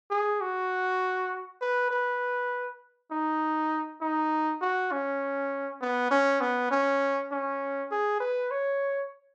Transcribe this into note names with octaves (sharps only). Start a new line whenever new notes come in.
G#4
F#4
B4
B4
D#4
D#4
F#4
C#4
B3
C#4
B3
C#4
C#4
G#4
B4
C#5